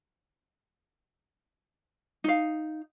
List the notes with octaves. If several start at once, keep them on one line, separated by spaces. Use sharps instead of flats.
D#4 F5